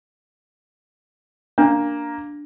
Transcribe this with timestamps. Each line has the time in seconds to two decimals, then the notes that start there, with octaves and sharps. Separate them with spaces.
1.58 A#3 D4